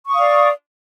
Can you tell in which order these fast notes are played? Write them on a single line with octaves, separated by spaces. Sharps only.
C#6 D#6 F5 D5